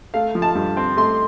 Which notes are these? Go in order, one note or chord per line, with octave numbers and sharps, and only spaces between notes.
A3 F5
F3
A5
G2
C4
A3 C6